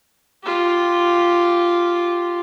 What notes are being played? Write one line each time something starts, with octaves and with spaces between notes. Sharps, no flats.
F4 G4